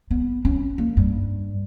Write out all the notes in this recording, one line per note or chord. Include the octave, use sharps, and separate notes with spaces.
B3
C#4
A#3
G2